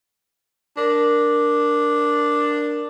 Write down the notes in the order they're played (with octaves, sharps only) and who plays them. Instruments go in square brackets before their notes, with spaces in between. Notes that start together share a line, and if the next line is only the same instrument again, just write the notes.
[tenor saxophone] D4 [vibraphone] A#4